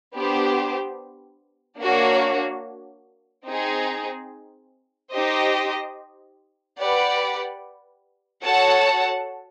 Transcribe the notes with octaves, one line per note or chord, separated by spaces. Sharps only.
B3 D4 G4 C5
A#3 D4 F#4 A#4 C#5
C4 D#4 G#4
D#4 G4 C5 D#5
G4 B4 D5 F#5
F#4 A4 C#5 F#5 A5